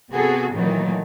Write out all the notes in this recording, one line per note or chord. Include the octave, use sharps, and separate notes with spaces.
C3 B3 F#4 G#4 A4
A#2 D#3 E3 F#3 A3 A#3